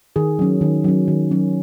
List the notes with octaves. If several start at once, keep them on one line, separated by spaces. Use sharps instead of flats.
D#3 G#4
F#3 C#4
D#3
F#3 C#4
D#3
F#3 C#4